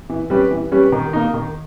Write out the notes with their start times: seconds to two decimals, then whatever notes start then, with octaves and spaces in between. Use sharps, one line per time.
0.10 E3
0.30 G3 C#4 G4 B4
0.51 E3
0.72 G3 C#4 G4 B4
0.92 D#3
1.13 A#3 D#4
1.34 D#3